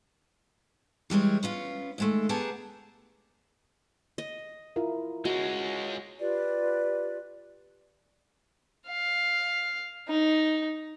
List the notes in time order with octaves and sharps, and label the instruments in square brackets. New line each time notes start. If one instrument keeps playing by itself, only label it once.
[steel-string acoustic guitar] E3 G3 G#3 C#5
B3 C#4 F4
D#2 G#3 A3
B3 G4 G#4 A#4 F#5 A5
[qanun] D#5
[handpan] E4 F4 A#4
[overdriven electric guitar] G#3 C#4 [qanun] F#4
[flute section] F4 G4 B4 D5
[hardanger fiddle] F5
D#4